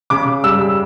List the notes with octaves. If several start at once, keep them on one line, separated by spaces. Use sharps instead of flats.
C#3 D6
G3 E6